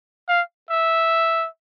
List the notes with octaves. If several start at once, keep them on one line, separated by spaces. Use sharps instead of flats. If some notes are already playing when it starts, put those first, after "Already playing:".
F5
E5